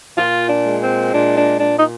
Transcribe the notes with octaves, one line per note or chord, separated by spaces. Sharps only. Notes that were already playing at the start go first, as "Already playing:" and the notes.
A#2 F4
D4
G#3
C4
A#2 D4
D4
A#2 D4
D#4